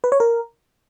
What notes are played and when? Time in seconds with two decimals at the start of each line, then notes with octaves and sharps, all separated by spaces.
0.04 B4
0.12 C#5
0.20 A#4